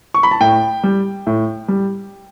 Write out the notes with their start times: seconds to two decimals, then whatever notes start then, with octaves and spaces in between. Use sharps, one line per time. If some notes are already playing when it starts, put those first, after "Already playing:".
0.14 C#6
0.23 B5
0.31 A5
0.41 A2 G5
0.83 G3
1.27 A2
1.68 G3